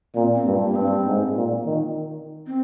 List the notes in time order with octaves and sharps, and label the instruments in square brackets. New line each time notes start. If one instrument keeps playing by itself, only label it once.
[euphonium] A#2 [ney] C4
[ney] C4
[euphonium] G2
[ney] A#3
[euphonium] G2 [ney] C4
[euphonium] G#2
A#2
D#3
[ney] C4